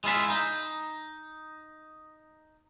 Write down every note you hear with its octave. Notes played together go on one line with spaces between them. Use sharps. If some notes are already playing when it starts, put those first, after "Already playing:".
G#3 E4 F4 E5
D#4